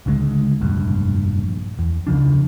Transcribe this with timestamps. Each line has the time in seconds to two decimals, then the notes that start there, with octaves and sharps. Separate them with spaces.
0.06 C#2 D3 D#3 G#3
0.61 F1 A#1 G2
1.79 E2
2.07 C#2 C#3 F3 D4